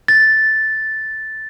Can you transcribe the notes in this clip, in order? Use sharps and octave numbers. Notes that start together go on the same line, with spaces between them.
A6